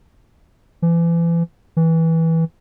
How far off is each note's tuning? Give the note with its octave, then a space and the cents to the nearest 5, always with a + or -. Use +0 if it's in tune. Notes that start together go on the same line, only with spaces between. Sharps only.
E3 +35
E3 -15